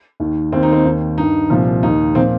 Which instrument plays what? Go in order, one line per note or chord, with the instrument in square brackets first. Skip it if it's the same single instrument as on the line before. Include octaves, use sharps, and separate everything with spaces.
[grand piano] D#2 D#3
D#2 D#3 C4
D#4
C4
D#2 D#3
G2 D#3 D#4
C2 A#2 F3
D#2 D#3 D#4
A#2 F3 C4